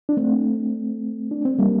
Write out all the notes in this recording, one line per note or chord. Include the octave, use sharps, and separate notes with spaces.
D4
A3 C4
D4
C4
G3 A#3